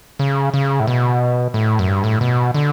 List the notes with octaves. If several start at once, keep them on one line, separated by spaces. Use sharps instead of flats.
C#3
C#3
A2
B2
A2
F#2
G2
A2
B2
D3